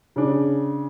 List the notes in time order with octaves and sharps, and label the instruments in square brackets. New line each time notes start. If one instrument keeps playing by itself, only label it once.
[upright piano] C#3 D4